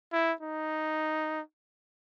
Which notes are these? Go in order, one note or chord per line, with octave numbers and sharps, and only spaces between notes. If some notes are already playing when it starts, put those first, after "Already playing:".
E4
D#4